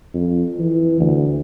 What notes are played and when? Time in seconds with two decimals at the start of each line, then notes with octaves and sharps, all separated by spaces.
0.14 F2
0.59 E3
1.00 D2